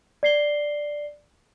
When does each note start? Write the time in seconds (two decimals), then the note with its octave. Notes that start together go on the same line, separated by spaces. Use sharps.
0.23 D5 C7 G7